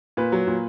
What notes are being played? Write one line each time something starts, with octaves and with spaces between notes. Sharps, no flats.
A#2 B4
F#3
A#2